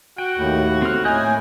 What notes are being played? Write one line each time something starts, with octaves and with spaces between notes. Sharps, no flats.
F#4 G5
D#2 A2
C4 F6
A2 D#5 G#5 F#6 G6
A#3